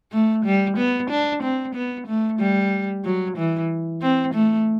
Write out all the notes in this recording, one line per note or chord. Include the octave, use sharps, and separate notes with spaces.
A3
G3
B3
D4
C4
B3
A3
G3
F#3
E3
C4
A3